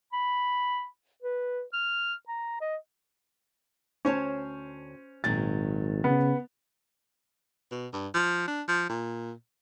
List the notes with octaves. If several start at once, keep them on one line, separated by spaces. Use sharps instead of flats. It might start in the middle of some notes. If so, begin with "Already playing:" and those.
B5
B4
F6
A#5
D#5
D2 C#4 C5 C#5 A5
G#1 A#2 D#3 F#3 A6
C#3 B3
B2
G2
F3
D4
F3
A#2